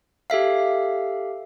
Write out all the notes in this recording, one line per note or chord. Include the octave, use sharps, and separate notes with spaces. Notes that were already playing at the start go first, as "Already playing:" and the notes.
G4 A4 E5 F5